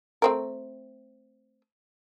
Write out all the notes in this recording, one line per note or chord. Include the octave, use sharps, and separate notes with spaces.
A3 C4 A#4